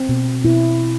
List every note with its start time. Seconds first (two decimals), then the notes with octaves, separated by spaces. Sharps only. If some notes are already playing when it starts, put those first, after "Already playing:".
Already playing: C4
0.09 B2
0.44 B2 E4